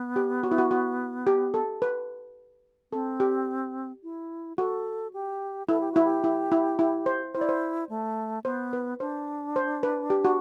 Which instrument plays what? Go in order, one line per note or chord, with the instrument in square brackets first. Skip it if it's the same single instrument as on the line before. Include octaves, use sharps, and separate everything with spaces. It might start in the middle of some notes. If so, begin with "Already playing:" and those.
Already playing: [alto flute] B3
[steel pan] G4
F#4
E4
F#4
F#4
G4
A4
B4
[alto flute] C4 [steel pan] A4
[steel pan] G4
[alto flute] E4
[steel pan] F#4 [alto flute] A4
[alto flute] G4
[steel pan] E4 [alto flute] A4
[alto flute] G4
[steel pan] E4 [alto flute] F#4
[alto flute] G4
[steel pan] E4
E4
E4
C5
[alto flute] E4 [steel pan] C5
[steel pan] D5
C5
[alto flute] A3
[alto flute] B3 [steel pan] C5
[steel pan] B4
[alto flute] D4 [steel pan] C5
[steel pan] C5
B4
G4
F#4